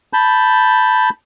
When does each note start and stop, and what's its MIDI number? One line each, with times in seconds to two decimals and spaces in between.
0.13 1.09 81
0.13 1.09 83
0.13 1.09 91